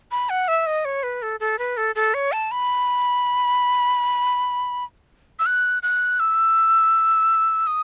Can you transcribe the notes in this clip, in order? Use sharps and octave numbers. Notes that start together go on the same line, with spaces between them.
B5
F#5
E5
D#5
C#5
B4
A4
A4
B4
A4
A4
C#5
A5
B5
E6
F#6
F#6
E6
D#6